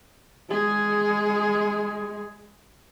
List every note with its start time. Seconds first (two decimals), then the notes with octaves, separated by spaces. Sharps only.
0.50 G#3 G#4